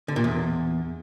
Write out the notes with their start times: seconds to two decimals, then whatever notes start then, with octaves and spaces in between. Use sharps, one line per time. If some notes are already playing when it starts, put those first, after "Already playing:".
0.08 D3
0.16 A#2
0.24 E2